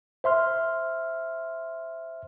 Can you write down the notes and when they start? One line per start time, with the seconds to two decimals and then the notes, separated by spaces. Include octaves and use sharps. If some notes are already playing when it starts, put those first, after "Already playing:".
0.24 C5 E5 C6 F6